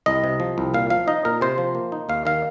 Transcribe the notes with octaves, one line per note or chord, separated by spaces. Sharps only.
C2 D#5
C3
F3
C2
A#2 F5
F3 F5
D#4 D#5
A#2 A#4
C3 C5
F3
A#3
D#4
D#2 F5
D#3 F5